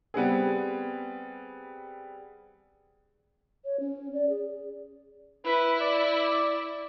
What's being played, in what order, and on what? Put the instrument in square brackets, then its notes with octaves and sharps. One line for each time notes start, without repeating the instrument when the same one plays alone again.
[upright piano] G3 B3 C4 G#4
[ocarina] C#5
C#4
D5
G#4
[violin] E4 [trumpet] B4
[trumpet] D5